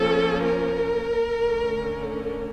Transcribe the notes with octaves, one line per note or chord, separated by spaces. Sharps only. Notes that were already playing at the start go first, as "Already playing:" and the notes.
Already playing: F3 A#3 C#4 A4
A#4
D3 A3 C#4